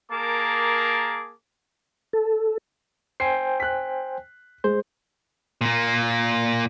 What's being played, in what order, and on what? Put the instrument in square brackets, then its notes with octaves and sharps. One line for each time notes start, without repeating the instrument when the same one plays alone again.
[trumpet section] A#3 G#4 A#4 A5 D6
[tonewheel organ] A4
[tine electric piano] C5 G5 G#5 [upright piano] C7
[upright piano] F#6 B6
[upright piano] G#3 [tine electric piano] C5
[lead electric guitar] A#2 A#3